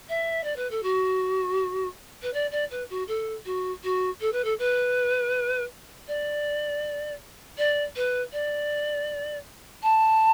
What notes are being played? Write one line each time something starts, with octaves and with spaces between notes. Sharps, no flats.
E5
D5
B4
A4
F#4
B4
D5
D5
B4
F#4
A4
F#4
F#4
A4
B4
A4
B4
D5
D5
B4
D5
A5